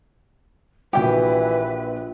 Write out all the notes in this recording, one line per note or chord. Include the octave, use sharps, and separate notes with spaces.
A#1 E3 F#4 G4 B4 G5